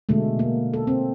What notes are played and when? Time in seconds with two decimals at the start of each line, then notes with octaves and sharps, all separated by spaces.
0.09 B2 D3 G#3 A3
0.39 A#3
0.73 A4
0.87 C4